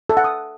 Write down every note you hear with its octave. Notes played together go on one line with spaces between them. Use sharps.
A4
F#5
D#6